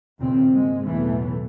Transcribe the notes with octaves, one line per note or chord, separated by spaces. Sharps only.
D#2 A#2 C#3 C4
G#2 G#3
B1 E2 A2 E3 A3